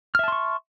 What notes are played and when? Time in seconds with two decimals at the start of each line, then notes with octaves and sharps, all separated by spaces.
0.15 F6
0.19 E5
0.24 A5
0.28 C6
0.32 C#6